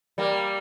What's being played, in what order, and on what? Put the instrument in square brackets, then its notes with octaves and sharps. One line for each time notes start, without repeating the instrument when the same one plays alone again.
[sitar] G3 A#3